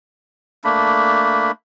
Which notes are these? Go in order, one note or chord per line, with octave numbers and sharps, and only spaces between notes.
A3 A#3 D4 B5